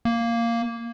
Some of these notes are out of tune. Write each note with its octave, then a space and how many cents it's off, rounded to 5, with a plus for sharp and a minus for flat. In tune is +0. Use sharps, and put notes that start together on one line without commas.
A#3 -5